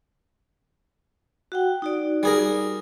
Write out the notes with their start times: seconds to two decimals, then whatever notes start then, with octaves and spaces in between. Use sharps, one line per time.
1.52 F#4 F#5 G5
1.82 D#4 F#4 D5
2.23 G3 G#4 A#4